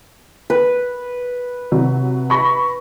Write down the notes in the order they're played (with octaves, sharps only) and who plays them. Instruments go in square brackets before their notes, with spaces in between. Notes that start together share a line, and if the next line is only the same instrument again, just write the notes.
[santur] B4
[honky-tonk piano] C3 F#3
B5 C#6 A#6